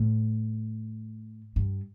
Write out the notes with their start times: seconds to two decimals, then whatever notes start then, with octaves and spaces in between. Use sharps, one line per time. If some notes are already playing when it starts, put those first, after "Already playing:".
Already playing: A2
1.56 G2